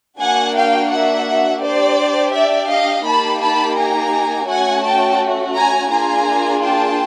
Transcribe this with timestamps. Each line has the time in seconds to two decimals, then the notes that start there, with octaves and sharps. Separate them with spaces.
0.19 A#3 D4 F#4 F#5 G#5
0.55 F5 G5
0.90 E5 F#5
1.62 D4 G4 C5 D5
2.34 D5 E5
2.69 D#5 F5
3.05 A#3 D#4 G4 A5 B5
3.41 A5 B5
3.76 G#5 A#5
4.47 A3 C#4 F#4 F#5 G#5
4.84 G5 A5
5.55 G#5 A#5
5.91 A#3 D4 F4 G#4 G#5 A#5
6.62 G5 A5